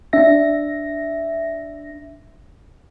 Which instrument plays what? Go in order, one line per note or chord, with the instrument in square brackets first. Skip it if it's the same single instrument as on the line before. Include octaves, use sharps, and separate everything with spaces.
[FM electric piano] D4 E5 A#6